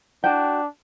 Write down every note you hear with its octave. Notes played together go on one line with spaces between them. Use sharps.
D4 F#4 G5